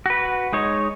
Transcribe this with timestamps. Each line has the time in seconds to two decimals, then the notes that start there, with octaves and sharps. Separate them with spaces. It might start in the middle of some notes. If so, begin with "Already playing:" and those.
0.06 F#4 B4
0.53 G#3 D#4 C#5